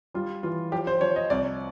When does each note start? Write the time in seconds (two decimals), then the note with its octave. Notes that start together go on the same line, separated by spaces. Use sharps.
0.14 G3 F4
0.43 E3 F4
0.72 F3 G4
0.87 C5
1.01 F3 C#5
1.16 D#5
1.30 C2 D5